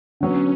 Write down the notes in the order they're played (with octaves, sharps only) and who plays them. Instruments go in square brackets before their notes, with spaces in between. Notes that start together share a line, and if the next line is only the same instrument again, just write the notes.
[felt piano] D3 F#3 B3 [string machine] C#4